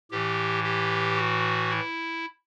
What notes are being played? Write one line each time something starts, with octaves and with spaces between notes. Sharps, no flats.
A2 E3 G4
G4
F#4
E4